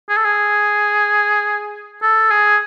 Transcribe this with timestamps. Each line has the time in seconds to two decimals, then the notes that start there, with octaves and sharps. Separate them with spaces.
0.09 G#4
0.17 A4
0.25 G#4
2.02 A4
2.31 G#4